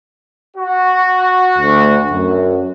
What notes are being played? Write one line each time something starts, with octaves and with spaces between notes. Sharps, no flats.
F#4
D2
F#2